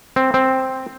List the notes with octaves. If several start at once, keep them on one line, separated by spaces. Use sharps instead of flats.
C4
C4